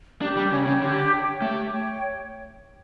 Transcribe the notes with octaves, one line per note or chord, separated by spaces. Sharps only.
D4 G4
G3
C#3 C#5 G5
C#3
D3 G4
C#5 G5
A3 G4
C#5 G5